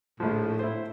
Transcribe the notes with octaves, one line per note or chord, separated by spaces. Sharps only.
A#1 A2 F3
E4 C5